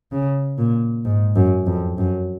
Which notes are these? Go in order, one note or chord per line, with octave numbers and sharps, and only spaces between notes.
C#3
A#2
G#2
F#2
F2
F#2